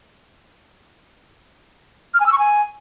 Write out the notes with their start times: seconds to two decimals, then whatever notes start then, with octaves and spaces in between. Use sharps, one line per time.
2.14 F6
2.20 G#5
2.26 E6
2.32 C#6
2.39 G#5